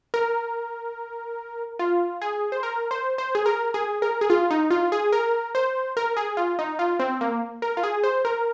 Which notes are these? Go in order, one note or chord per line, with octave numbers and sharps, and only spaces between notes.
A#4
F4
G#4
C5
A#4
C5
C5
G#4
A#4
G#4
A#4
G#4
F4
D#4
F4
G#4
A#4
C5
A#4
G#4
F4
D#4
F4
C4
A#3
A#4
F4
G#4
C5
A#4